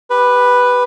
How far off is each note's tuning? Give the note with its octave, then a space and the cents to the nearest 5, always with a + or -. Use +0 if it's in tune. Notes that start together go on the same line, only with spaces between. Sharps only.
G4 +15 B4 +0